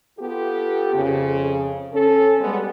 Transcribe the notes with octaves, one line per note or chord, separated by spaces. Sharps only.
B3 F4 G4 A4
F2 C#3
C#4 A4
G3 G#3 B3